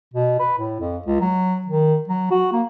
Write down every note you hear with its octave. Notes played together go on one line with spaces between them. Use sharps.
B2
B4
A2
F2
C#2
F#3
D#3
F#3
F#4
A#3